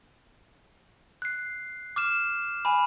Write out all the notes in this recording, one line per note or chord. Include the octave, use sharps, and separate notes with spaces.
F#6 C7
D6 F6 E7
G#5 B5